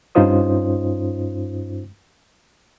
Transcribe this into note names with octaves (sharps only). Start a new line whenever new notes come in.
G2 C#4 D#4 F4 C5 D#6